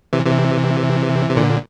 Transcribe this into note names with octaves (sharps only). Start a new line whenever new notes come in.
C3 E3
C3 E3
C3
A#2 D3